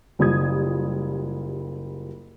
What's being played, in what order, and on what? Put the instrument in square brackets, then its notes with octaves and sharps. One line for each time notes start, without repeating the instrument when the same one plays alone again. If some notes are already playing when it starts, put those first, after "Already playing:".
[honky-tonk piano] F#1 G3 F4 D#6 G#6